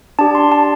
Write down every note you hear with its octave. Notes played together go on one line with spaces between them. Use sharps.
D4 G4 A5
C6
A5